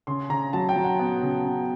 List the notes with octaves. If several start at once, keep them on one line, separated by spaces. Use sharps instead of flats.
C#3 C6
C#3 A#5
F#3 A5
G5
F#3
F#5
B3
C#3
B3